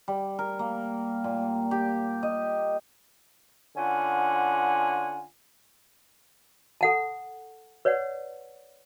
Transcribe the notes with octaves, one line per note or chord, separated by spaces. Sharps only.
G3
A#4
A#3
A#2
G4
D#5
D3 C#4 F4 F#5 G#5
A4 F#5 A5
B4 C#5 D5 F#5